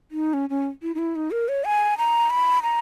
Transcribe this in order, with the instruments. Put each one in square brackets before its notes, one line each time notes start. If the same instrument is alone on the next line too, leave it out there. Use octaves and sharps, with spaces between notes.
[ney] D#4
C#4
C#4
E4
D#4
E4
D#4
A#4
C#5
G#5
A#5
B5
A#5